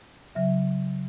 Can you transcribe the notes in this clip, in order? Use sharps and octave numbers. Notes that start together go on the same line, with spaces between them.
C#3 F#3 E5